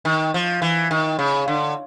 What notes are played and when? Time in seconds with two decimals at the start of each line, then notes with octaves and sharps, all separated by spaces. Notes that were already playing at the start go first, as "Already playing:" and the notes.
0.05 D#3
0.34 F3
0.62 E3
0.91 D#3
1.19 C#3
1.48 D3